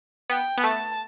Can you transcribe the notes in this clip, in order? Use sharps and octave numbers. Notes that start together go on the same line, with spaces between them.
B3 G5
B3
A3 A5